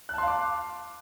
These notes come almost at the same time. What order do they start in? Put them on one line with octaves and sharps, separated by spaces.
F#6 A5 C6 F5 D6